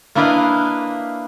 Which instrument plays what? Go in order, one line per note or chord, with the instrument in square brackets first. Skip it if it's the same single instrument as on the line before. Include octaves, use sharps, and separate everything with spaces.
[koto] A#3 D4 E4 B4 D#5 F5